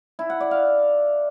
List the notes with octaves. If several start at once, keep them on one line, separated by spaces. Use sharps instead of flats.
E4
F#5
D5
F5